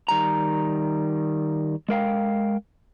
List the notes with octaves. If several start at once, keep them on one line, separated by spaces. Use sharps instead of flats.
D#3 G3 A#5
G#3 A#4 F5 G5